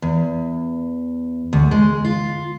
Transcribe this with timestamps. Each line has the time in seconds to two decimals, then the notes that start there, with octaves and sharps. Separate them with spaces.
0.02 E2
1.53 D2
1.71 G#3
2.05 F4